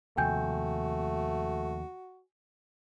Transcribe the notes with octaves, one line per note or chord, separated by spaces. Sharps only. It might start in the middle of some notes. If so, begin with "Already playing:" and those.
D#2 C3 F3 A3 F#4 G5 G#5 G6